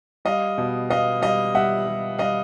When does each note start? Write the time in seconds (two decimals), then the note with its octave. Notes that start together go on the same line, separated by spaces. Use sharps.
0.25 G3 D#5 F5
0.58 B2
0.89 B3 D#5 F5
1.21 G3 D#5 F5
1.54 G3 E5 F#5
1.87 G3
2.18 G3 D#5 F5